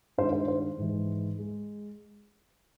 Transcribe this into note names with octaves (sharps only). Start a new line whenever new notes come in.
G2 D#3 G#3 C5
C5
C5
G#2 E3 G#3
G#3